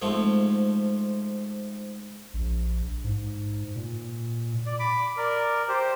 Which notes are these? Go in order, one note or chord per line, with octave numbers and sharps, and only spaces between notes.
G#2 F3 A3 C4
A#1
G#2
A#2
D5
B5 D6
A#4 D5
G4 C5